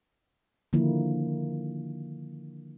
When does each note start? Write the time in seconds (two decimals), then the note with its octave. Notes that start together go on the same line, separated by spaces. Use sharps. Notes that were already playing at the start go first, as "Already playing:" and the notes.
0.73 D3 D#3 F3 A#3 E4